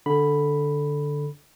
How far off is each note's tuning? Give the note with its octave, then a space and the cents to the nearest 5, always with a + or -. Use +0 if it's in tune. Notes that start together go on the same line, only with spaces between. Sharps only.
D3 +0 B5 +0